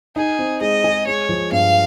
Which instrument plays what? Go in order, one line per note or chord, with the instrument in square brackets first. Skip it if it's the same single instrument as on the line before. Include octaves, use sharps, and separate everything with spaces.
[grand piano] D#4 [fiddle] G#4
[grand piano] C4
[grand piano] G#3 [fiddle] D#5
[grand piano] G#4
[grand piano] G#3 [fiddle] C#5
[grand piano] F3
[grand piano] G2 [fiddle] F5